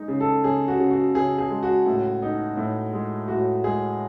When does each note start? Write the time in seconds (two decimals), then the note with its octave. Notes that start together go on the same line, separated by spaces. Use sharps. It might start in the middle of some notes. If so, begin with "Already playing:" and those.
Already playing: G#3 D#4
0.08 C#3
0.20 A4
0.44 C#3 G#4
0.68 F#4
0.79 C#3
0.91 F#4
1.15 C#3 G#4
1.38 G#4
1.50 G#3
1.63 F#4
1.86 A2
2.22 D#4
2.57 A2
2.93 G#3
3.28 A2 F#4
3.64 G#3 G#4